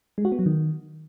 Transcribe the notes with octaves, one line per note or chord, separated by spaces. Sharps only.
G#3
F#4
B3
F#3
D#3